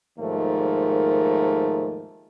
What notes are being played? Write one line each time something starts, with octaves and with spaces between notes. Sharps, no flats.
D#2 G#2 F3 A3 A#4